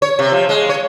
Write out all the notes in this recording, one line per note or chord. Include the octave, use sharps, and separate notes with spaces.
C#5
C3
F3
G#3
C#5